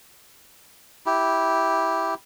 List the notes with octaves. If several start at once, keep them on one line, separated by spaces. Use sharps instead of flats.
E4 G4